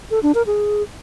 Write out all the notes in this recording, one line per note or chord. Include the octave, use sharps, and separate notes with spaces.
A4
D4
A#4
G#4